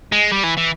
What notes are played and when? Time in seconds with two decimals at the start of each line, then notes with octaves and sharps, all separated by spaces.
0.12 G#3
0.32 G3
0.44 E3
0.57 E3